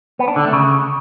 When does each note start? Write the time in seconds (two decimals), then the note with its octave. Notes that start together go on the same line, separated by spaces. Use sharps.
0.19 B3
0.28 D4
0.36 D3
0.45 A3
0.53 C#3